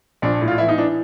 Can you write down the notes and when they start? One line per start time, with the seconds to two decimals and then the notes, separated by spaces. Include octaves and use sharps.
0.22 A#1 D4
0.41 A2
0.48 F4
0.58 E3 E4
0.69 D#4
0.78 E3 D4